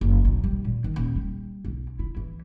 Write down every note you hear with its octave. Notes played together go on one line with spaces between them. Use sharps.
F#1
B1
G3
A#2
D#3
D#1
G3
B1
E4
E3